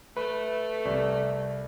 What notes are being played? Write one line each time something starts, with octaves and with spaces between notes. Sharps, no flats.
A3 B4
C2